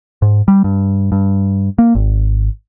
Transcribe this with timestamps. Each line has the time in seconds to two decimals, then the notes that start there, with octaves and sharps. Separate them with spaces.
0.22 G#2
0.48 G3
0.64 G2
1.12 G2
1.78 A#3
1.95 G#1